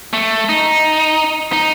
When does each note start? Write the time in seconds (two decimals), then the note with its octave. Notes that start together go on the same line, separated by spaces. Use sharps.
0.13 A3
0.49 D#4
1.53 D#4